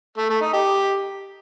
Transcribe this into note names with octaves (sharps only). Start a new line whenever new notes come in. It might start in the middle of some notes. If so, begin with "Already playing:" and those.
A3
A3
D#4
G4